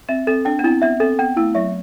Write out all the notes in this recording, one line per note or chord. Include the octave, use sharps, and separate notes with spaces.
C4 E5
C4 A4
D4 G5
B3
C4 E4
B3 E5
C4 A4
B3 G5
A3 E4
F#3 E5